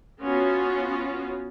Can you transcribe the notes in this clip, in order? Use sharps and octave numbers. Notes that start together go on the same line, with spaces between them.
B3 C#4 F4 F#4